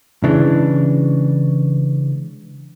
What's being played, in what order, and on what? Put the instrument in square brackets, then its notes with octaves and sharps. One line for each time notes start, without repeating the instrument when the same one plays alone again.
[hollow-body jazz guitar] C#3 E3 G#3 D4